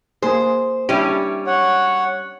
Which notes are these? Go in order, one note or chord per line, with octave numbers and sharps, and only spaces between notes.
A#3 G#4 C5
G3 C#4 D4 E4 G4
C#5 F#5